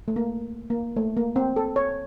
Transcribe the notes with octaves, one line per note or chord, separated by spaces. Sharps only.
A3
A#3
A#3
A3
A#3
C4
A4
C#5